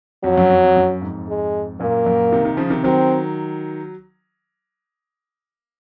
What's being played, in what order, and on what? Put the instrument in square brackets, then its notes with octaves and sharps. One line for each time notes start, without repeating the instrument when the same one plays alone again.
[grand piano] F2 [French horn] F#3
[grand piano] F#2
F2
F2
F#2
F2 G#2
[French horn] G#3
[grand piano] F#2 A#2 [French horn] A#3
[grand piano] F#2 A#2
C3 D#3
C3 D#3
C#3 F3
C3 D#3
[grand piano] D#3 F#3 [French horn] C4